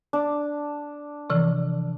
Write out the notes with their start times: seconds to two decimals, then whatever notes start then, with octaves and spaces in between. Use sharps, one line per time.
0.13 D4
1.30 C3 E3 F3